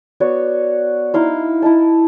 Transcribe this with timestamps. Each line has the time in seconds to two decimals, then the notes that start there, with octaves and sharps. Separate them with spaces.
0.20 B3 F#4 C#5 D5
1.14 D#4 E4 F5 C6
1.62 E4 D#5 A5